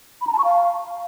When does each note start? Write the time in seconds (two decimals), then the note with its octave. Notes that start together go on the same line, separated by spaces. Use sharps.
0.21 B5
0.27 A#5
0.33 A5
0.39 C#6
0.44 F5